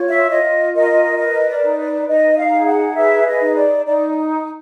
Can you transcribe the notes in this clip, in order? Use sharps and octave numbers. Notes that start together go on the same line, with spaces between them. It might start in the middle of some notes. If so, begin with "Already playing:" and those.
Already playing: F4 C#5
E5
F4 D#5
A#4 D#5
B4 D#5
D5
D#4
D5
D#4 D#5
F5
G#4
F#5
B4 E5
D#5
D#4
D5
D#4 D5